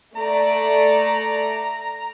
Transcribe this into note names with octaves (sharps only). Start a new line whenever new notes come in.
A3 D5 A#5